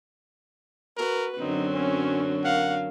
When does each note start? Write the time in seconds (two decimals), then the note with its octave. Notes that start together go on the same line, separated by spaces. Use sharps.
0.97 F#4 A#4 B4
1.40 F#2 D3 F#3 C4 D#4
1.73 C#4
2.44 A#4 F5 F#5